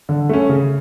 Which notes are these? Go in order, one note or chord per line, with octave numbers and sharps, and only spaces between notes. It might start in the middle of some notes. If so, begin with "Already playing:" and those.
D3
A3 C#4
C#3